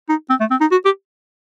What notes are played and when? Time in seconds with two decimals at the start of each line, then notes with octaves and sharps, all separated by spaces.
0.09 D#4
0.30 C4
0.40 A3
0.51 C4
0.61 D#4
0.71 F#4
0.85 G4